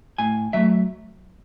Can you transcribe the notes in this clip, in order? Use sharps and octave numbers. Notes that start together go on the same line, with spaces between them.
A2 G#5
F#3 A3 E5